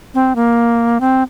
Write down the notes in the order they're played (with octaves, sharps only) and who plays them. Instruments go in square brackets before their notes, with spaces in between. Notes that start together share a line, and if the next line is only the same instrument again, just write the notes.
[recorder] C4
A#3
C4